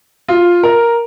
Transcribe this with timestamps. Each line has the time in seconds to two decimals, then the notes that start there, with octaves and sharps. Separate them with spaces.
0.28 F4
0.63 A#4